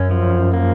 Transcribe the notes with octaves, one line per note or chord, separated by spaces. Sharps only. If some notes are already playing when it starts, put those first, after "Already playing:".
Already playing: F#2 C#4
F3
A#3